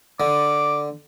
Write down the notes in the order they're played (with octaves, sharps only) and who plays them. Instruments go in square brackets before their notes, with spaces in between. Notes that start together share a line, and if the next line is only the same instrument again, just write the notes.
[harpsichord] D3 [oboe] D6